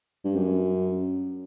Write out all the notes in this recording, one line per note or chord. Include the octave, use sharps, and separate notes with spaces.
G2
F#2